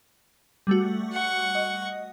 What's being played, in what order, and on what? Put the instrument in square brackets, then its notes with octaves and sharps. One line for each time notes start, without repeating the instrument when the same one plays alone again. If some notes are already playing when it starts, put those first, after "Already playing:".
[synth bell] G3 A3 F#4
[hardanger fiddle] F#5 C#6
[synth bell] D#5